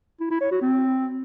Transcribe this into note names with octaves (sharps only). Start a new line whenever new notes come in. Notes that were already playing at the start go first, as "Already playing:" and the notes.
E4
E4
C#5
F#4
C4